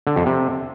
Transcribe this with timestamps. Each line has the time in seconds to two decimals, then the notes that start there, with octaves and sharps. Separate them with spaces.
0.07 D3
0.16 F2
0.26 C3